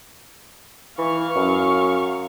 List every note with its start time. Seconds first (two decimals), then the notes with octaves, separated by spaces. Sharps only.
0.98 E3 F5 C#6
1.36 F#2